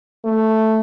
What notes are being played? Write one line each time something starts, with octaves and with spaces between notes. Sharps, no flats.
A3